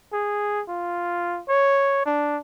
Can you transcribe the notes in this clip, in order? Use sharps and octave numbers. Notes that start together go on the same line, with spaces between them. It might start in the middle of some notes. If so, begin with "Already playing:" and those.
G#4
F4
C#5
D4